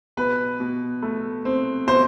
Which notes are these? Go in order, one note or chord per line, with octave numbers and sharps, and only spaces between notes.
B2 B4
B2
A3
C4
B2 C5